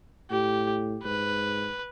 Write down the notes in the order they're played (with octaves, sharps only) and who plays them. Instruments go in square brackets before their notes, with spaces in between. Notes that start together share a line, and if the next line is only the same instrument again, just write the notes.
[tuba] A2 [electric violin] G4
[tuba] G#2 [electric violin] B4